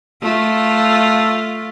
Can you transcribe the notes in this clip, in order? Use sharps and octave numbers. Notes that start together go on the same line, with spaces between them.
A3 F4